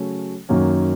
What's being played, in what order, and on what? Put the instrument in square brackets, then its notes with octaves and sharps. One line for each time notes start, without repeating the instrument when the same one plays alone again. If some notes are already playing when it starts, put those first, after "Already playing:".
Already playing: [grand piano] C#3 F#3 A3 C#4
F#2 D#3 F#3 A#3 C#4